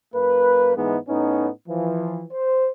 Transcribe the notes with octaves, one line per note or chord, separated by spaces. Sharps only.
F#2 A#3 B4
G#2 E3 G#3 B3 D#4
A2 B3 C#4 D#4
E3 F3
C5